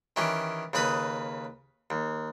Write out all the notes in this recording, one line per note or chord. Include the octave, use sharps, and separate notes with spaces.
D#3 E3 C#4 G4
D#2 C#3 B4 B5 D#6
D#2